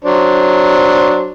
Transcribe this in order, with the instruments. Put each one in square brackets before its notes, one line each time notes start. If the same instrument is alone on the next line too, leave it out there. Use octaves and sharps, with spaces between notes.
[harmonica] F#3 D4 C5